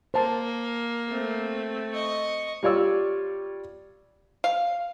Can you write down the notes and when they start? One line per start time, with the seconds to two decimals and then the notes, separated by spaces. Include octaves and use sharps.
0.14 A#3 C5 A5
1.10 A3 C4
1.93 D#5 C#6
2.63 G3 F4 C#5 D5 E6
4.44 F5